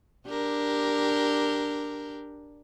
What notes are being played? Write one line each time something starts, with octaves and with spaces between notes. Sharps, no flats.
D4 G4 A#4